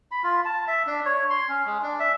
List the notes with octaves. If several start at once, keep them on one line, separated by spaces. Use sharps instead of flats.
B5
F4
A5
E5
D4
C#5
C6
C#4
G#3
D4
E5